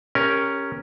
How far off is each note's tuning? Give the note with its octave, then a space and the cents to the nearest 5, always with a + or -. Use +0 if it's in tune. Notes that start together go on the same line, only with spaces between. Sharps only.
C#4 +0 G4 +25 A#4 +0